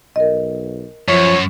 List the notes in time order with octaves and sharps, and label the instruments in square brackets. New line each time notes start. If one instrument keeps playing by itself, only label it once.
[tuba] B1 [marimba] A#4 D#5
[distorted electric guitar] F#2 [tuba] F3 [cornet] C#5